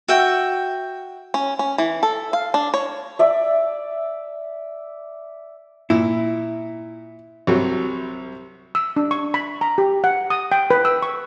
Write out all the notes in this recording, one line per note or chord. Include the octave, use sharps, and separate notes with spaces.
F#4 E5 G5
C#4
C#4
E3
A4
F5
D4
C#5
D5 E5
A#2 E4
C2 F#3 G3
E6
D4
C#6
B5
A#5
G4
F#5
D#6
G5
B4
E6
C#6